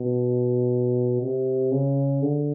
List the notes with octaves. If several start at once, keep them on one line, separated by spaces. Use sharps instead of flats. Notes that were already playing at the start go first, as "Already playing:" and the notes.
Already playing: B2
C3
C#3
D3